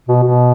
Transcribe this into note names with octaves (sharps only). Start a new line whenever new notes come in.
B2
B2